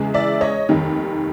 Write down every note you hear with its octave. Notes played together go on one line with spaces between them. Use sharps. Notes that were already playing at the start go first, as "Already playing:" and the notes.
Already playing: E2 C#3 E3 G#3
D5 E5
C#5 D#5
F1 D#2 D#3 G3